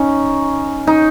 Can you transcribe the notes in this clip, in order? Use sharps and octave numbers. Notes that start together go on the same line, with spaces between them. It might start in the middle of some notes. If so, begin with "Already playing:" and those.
Already playing: C#4 D#4
D#4